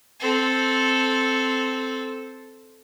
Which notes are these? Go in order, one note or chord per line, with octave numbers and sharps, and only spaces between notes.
C4 A4